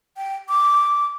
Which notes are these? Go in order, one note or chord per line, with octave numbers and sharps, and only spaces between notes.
G5
D6